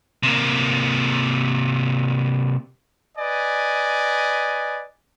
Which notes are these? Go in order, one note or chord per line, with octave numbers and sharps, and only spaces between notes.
C3 A#3
B4 D5 D#5 G#5